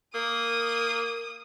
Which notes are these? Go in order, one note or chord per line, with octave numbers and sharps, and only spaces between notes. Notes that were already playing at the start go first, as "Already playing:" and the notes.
A#3 D#6